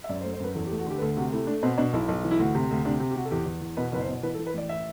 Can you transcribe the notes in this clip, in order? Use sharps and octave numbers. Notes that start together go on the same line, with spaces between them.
E5
F#2 D5
C5
A3
C5
F#2 B4
E2 A4
G4
A3
F#4
D3 G4
B4
D2 A4
C3 F#4
A3 E4
A3 D4
B2 C4
B2 D4
B1 E4
B1
E3
E4
D2 F#4
C3
D2
C3 D4
C3
G4
C3 F#4
A4
E2 G4
E2
E2
B2 B4
F#1 B4
C5
B2
E3 B4
A4
E3
B4
A1 D5
E5